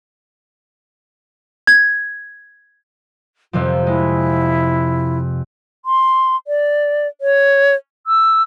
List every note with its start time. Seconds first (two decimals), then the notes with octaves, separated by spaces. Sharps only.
1.67 G#6
3.53 F2 C3 F3 F4
3.87 G#3 E4
5.85 C6
6.47 D5
7.21 C#5
8.07 E6